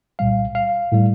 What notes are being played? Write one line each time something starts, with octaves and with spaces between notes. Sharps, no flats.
C2 A#2 G3 F5
F5
A2 G3